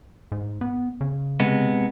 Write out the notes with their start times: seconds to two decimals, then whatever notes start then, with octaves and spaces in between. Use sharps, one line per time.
0.32 G#2
0.61 B3
1.01 C#3
1.40 C3 G#3 B3